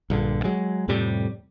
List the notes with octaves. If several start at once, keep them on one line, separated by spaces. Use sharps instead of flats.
A#1 G2 D3
F#3 G#3
F2 A2 C3 G3